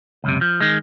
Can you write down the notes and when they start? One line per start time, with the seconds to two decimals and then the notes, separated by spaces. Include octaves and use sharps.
0.24 C#2 F#2 C3
0.41 F3
0.60 D#3 G#3